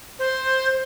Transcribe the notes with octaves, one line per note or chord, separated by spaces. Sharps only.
C5